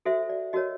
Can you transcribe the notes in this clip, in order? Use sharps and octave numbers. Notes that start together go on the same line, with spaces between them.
F#4 A4 C5 E5
D5
F#4 A#4 C#5 D#5